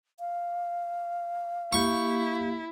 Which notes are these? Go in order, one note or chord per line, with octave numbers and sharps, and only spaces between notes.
F5
A#3 E4 G4 C#6